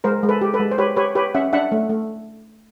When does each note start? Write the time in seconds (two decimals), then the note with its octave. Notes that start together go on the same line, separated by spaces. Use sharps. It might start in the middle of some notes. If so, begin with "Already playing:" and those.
0.04 G#3 A#4 C5
0.23 G#3
0.29 A4 B4
0.41 G4
0.54 A4 B4
0.60 G#3
0.71 C5
0.78 G4 B4 C#5
0.96 G4 B4 C#5
1.15 G4 B4 C#5
1.35 C#4 E5 F#5
1.53 D4 E5 F#5
1.72 A3
1.89 A3